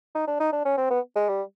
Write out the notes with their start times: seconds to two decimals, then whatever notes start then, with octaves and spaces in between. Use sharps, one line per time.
0.15 D#4
0.27 D4
0.40 D#4
0.53 D4
0.65 C#4
0.77 C4
0.91 B3
1.16 G#3
1.29 G3